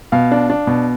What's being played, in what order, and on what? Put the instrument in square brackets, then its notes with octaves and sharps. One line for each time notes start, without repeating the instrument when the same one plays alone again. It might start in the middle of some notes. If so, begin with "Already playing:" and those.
[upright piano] B2 F5
D4
D4
B2